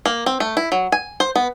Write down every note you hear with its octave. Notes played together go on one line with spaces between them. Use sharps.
A#3
C4
A3
E4
F#3
G#5
C5
B3